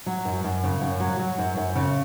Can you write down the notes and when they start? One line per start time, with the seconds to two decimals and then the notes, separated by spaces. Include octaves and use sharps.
0.06 F#3
0.25 F#2
0.44 F#2
0.64 C#3
0.82 F#2
1.00 F#3
1.19 F#3
1.38 F#2
1.57 F#2
1.75 C#3